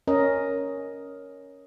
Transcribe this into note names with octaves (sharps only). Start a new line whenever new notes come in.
C#4 A#4 D#5